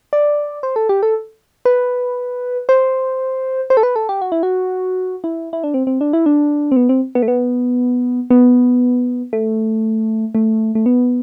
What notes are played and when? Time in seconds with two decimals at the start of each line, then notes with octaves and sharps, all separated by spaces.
0.13 D5
0.63 C5
0.76 A4
0.89 G4
1.03 A4
1.65 B4
2.69 C5
3.70 C5
3.77 A4
3.83 B4
3.96 A4
4.09 G4
4.21 F#4
4.32 E4
4.43 F#4
5.24 E4
5.53 E4
5.64 D4
5.74 C4
5.87 C4
6.01 D4
6.13 E4
6.26 D4
6.72 C4
6.76 B3
6.89 C4
7.15 B3
7.23 A3
7.28 B3
8.30 B3
9.33 A3
10.35 A3
10.75 A3
10.86 B3